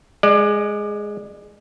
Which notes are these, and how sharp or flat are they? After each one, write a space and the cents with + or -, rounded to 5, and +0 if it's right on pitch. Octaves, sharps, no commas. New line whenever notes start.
G#3 +0 D5 +30